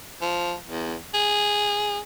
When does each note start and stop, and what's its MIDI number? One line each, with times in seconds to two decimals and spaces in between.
0.21 0.55 53
0.66 0.95 40
1.14 2.00 68